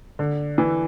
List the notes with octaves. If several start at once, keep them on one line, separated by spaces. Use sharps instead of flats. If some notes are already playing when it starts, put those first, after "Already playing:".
D3
E3